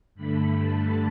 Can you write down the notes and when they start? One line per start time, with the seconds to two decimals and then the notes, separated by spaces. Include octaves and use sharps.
0.15 G2 D3 A3 B5
0.58 A5